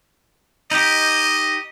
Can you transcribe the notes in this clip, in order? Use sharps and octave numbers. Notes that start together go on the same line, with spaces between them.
D#4 G4 D#5